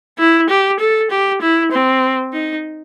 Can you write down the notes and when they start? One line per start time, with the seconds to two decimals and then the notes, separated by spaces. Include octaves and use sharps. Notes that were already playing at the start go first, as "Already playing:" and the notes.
0.19 E4
0.49 G4
0.79 A4
1.11 G4
1.41 E4
1.72 C4
2.33 D#4